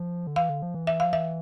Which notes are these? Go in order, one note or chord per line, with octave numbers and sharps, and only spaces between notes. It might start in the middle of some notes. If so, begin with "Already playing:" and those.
Already playing: F3
D3
E3 F5
D3
F3
E3
E5
F3 F5
E3 E5